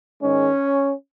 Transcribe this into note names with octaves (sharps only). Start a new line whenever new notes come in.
G#2 D#3 G#3 C#4